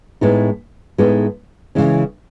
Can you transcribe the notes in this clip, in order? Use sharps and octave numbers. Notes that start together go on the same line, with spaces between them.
A2 G#3 B3 D#4 A4
A2 G#3 B3 D#4 A4
C#3 E3 G#3 C#4